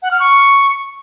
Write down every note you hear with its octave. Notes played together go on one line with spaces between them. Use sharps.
F#5
F6
C#6